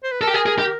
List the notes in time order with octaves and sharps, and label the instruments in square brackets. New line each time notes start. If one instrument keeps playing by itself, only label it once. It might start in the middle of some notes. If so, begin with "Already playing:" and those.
[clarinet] C5
B4
[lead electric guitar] A4 [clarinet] A#4
[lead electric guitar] G4
G#4
G#4
G4